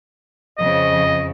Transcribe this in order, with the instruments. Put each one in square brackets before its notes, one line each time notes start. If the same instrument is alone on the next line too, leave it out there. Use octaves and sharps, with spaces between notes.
[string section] F2 C#3 [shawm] D#5